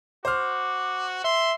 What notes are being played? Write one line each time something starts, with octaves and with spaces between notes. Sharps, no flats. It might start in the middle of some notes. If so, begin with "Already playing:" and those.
F#4 C5 D6 F6
E5 C6